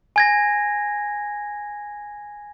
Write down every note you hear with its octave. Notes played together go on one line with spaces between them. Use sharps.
G#5 G#6 A#6